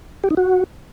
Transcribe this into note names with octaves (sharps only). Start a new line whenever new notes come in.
G4
D#4
F#4